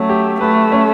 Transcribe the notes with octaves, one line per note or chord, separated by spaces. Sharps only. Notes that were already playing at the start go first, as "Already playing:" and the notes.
Already playing: F#3 A3 C#4
G4
A3 B4
C#4